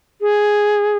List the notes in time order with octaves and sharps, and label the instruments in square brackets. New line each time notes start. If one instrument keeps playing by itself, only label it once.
[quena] G#4